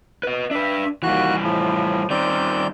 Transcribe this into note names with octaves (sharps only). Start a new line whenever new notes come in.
B4 D#5
D4 B4 E5
D#2 E3 G3 F#4 F#6
A2 F3
D#3 G3 C4 D5 G6